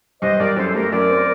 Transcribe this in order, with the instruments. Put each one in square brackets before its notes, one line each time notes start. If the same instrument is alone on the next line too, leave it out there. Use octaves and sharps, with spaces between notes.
[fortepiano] G2 [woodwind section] C5 D#5
[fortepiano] G2 [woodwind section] A#4 D5
[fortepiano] F#2 [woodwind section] A4 C5
[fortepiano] A3 [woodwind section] G4 A#4
[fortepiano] F#2 [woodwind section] A#4 D5
[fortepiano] C4